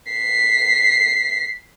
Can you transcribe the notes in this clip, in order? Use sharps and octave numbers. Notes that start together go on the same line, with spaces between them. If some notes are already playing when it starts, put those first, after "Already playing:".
B6 C7